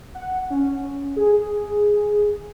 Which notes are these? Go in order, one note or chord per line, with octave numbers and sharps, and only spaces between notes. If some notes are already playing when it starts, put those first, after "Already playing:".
F#5
C#4
G#4